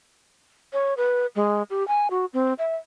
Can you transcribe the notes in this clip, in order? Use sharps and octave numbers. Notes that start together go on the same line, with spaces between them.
C#5
B4
G#3
G4
G#5
F#4
C4
E5